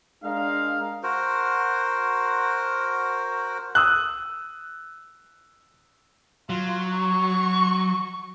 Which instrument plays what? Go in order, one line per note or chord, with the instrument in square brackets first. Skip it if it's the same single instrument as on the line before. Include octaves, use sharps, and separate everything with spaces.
[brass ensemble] G#3 D4 A#4 D#5 F5
[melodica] F#4 A#4 C5
[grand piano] D#6 E6 F#6
[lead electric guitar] F#3 [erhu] F4
[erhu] C#6